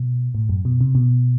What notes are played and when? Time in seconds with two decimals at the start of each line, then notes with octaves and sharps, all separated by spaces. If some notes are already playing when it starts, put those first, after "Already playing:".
Already playing: B2
0.35 A2
0.49 F#2
0.65 B2
0.81 C3
0.95 B2